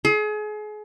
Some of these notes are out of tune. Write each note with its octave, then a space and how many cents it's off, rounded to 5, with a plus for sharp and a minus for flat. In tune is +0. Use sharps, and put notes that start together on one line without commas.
G#4 +35